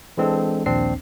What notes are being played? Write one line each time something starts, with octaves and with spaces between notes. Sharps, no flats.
E3 G#3 C4 D4 A4
A#1 D#2 C4 D4 C7